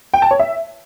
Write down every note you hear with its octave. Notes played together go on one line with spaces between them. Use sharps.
G5
A5
C#5
E5